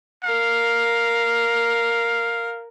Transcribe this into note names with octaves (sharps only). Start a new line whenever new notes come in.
A#4 F5